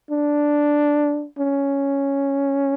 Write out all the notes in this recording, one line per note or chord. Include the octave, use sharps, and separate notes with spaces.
D4
C#4